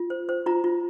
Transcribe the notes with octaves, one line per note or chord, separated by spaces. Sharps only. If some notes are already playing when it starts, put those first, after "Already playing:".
Already playing: F4
C5
C5
F4 A#5
F4